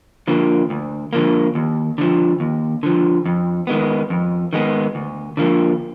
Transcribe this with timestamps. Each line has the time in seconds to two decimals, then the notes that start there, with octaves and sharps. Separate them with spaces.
0.28 D3 F3 A#3
0.70 D2
1.13 D3 F3 A#3
1.55 D#2
1.98 D3 F3
2.40 D#2
2.83 D3 F3
3.26 F2
3.67 D#3 G#3 B3
4.10 F2
4.53 D#3 G#3 B3
4.95 D2
5.37 D3 F3 A#3